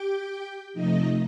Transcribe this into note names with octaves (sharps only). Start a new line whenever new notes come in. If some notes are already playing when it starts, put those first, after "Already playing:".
Already playing: G4 G5
C3 F3 A3 D#4 D#5